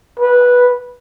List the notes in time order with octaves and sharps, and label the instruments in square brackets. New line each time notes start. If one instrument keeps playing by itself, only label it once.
[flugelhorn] B4